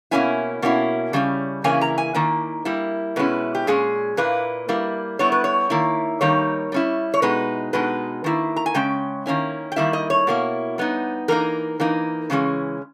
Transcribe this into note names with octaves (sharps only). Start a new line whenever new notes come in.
B2 A#3 C#4 E4 G#5
B2 A#3 C#4 E4
C#3 G3 C#4
C#3 E3 A#3 C#4 E4 G#5
A#5
G#5
D#3 A#3 E4
G3 A#3 E4
B2 G#3 C#4 E4 B4
G4
A#2 G#3 C#4 G#4
A#2 A#3 E4 B4
G3 A#3 E4
G3 B3 E4 C#5
B4
C#5
D#3 A#3 E4
D#3 G3 A#3 D#4 C#5
G3 C#4 E4
C#5
B2 G#3 D#4 B4
B2 G#3 D#4 B4
D#3 A#3 E4
A#5
G#5
C#3 G#3 C#4 G5
D#3 A#3 C#4 E4
G5
D#3 G3 A#3 E4 E5
D#5
C#5
B2 A#3 E4
G3 B3 D#4
E3 A#3 D#4 A#4
E3 A#3 D#4
C#3 E3 G#3 C#4